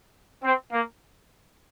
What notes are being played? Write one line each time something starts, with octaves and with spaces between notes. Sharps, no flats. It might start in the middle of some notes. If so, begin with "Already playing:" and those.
C4
A#3